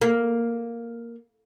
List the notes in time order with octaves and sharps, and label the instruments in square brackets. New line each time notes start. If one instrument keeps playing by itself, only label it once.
[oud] A#3